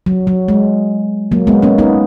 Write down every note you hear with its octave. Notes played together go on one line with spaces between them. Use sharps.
F#3
F#3
G#3
F#3 A#3
G#3 B3
A#3 C#4
B3 D#4